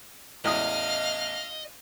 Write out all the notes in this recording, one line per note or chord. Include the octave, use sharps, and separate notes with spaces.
A1 E2 D#5 F5 D#6 F6